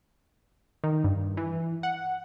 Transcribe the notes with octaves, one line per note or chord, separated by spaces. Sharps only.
D#3
G2
E3
F#5